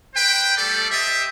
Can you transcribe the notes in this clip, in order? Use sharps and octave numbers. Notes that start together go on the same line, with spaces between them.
B4 C5 G5
G3 A3 A4 D5
G4 C5 D#5 E5